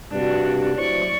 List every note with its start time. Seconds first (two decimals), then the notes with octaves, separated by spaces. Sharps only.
0.12 G2 C3 D4 F#4
0.78 F#3 E4 C5 D5 C#6